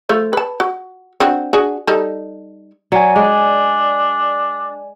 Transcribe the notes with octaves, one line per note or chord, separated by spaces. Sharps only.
F3 A3 F4
B4 A5
F#4
C4 D4 F#4
D4 F#4 G#4
G3 D#4 A4
F#3 D5 G#5
G#3 D4